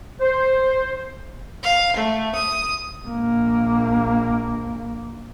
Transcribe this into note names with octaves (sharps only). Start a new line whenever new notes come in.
C5
F5
A3
D#6
A#1 A#3